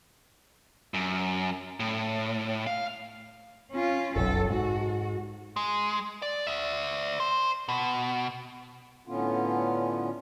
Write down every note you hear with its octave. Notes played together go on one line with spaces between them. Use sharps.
F#2
A2
F5
C#4 F4
F1 B1 F#2 A4
G#2 F#4
G#3
D5
D5 E5
C5
B2
A2 D3 B3 C#4 F4